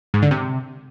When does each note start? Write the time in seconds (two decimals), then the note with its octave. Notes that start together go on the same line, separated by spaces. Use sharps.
0.14 G#2
0.22 D3
0.31 C3